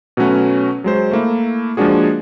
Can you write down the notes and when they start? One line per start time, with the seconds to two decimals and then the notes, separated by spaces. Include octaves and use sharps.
0.17 B2 F#3 A3 C#4 F#4 B4
0.84 F#3 G#3 C5
1.11 A3 A#3 E4
1.77 F3 G#3 A#3 D4 F#4 G#4